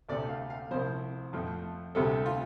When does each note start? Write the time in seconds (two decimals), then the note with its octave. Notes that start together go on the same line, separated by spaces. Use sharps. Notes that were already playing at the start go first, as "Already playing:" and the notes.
0.09 D2 C3 A3 D5
0.29 F5
0.50 F5
0.71 C2 C3 F3 C5
1.33 F2 F3 A3
1.95 D2 C3 G3 A4
2.26 F4